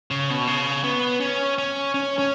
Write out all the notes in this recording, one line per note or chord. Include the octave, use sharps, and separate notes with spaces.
C#3
B2
C#3
B3
C#4
C#4
C#4
C#4